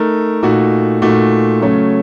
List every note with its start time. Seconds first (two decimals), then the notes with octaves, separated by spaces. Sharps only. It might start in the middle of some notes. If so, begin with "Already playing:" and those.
Already playing: A3 D#4 A#4
0.43 A#2 A3 D#4 F#4
1.02 A#2 A3 D#4 F#4
1.61 C#3 F#3 A3 C#4